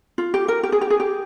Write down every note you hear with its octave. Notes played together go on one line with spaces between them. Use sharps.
F4
G4
A#4
G4
G#4
G4
G#4
G4